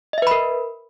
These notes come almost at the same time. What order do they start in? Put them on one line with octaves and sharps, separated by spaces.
D#5 E5 B4 B5 A#4